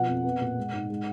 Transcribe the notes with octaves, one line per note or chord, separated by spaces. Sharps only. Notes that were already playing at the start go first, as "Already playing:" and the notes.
Already playing: B2 F3 F#5
F2
B3
A#2
G#3
G#2
G#3